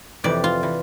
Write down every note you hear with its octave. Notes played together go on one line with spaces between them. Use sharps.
F2 C3 E3 D5
F4
E3